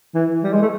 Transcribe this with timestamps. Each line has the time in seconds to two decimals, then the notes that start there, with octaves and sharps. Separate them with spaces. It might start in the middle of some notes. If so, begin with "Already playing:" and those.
0.14 E3
0.43 G3
0.53 G#3
0.62 A3